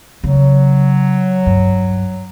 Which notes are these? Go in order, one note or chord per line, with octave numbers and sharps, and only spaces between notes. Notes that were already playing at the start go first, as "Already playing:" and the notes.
C#3 F#3
G2